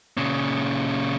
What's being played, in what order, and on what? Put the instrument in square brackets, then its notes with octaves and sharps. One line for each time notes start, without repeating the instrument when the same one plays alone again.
[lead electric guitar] A#2 C#3